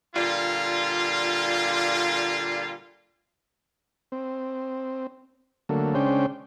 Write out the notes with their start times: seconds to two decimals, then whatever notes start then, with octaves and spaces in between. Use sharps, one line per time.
0.15 A#2 D3 G3 F4
4.12 C4
5.69 D3 F#3 A3 A#3
5.95 C#3 G#3 C#4 D4 C5 G5